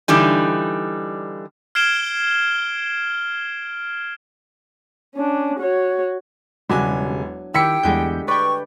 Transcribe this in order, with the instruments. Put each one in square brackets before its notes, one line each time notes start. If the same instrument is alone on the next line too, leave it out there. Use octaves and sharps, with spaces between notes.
[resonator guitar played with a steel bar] D3 E3 G3 D#4
[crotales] F6 G#6 C7 D7 E7 G7
[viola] C#4 D4
F#4 C#5
[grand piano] E1 G#5 [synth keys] C#3 G3 [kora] F#3 D4 E4
[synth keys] D#3 [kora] E4 G4 [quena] G5 [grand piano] E6 B6 C#7
[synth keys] E2 G6 [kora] D3 G3 G#3
[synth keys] B4 G5 [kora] D5 [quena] C#6